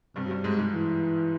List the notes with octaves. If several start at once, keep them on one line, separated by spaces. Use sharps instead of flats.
G2 C3 G3
F#3
G2 G3
G#2 G#3
G#2 G#3
E3